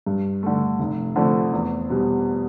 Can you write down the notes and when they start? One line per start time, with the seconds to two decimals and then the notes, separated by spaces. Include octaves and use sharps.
0.06 G2
0.43 D3 A3
0.79 F1
1.16 F2 D3 A3
1.53 E2
1.90 B2 G3